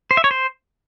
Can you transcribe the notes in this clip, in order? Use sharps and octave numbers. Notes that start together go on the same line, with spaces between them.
C5
E5
C#5
C5